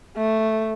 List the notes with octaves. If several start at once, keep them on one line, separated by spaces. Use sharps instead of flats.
A3